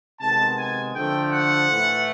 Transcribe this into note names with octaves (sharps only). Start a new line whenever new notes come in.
C3 D#3 G#3 B3 A5
G#5
D3 F3 A3 G5
F#5
A2 E3 A3